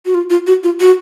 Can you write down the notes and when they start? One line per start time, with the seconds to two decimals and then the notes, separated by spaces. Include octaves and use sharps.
0.06 F#4
0.15 F4
0.30 F4
0.47 F#4
0.64 F4
0.81 F#4